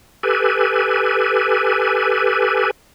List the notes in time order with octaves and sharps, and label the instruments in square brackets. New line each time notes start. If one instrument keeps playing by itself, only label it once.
[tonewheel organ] G4 A4 B4 G#5